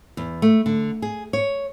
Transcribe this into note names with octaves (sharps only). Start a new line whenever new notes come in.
E2
A3
D3
G#4
C#5